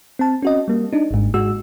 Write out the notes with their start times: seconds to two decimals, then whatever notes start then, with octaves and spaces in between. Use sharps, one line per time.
0.19 C4 A5
0.42 C#4 F#4 D#5
0.68 G3 A#3
0.93 D4 D#4
1.11 G#1 G#2
1.34 G#2 G#3 F#4 E6